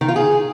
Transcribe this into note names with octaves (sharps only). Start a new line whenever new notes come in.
D#3
F4
G#4